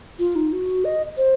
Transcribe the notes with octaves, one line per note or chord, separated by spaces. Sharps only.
F4
D#4
F#4
D#5
C5